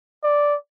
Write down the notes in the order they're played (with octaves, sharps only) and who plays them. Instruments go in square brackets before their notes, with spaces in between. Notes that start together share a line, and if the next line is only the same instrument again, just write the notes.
[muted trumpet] D5